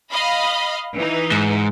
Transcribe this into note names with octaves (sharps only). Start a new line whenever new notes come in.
D#5 F5 B5
E3 D#4
G#2